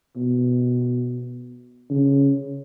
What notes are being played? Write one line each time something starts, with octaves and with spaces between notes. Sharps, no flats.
B2
C#3